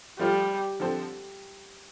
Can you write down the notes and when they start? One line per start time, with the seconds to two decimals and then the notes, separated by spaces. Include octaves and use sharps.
0.19 F3 G3 A3 F4 C5
0.80 D3 F3 C4 A4 C5